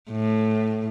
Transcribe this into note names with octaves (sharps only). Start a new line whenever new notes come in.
A2